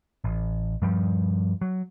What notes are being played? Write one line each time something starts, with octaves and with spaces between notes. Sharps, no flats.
A1
G2 F3 G3
F#3